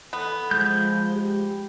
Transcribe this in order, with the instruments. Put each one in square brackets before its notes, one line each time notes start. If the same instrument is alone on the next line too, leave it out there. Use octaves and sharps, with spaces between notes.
[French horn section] E3 A4 [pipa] B3
[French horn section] F3 [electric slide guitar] G#3 [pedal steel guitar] G6
[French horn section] G4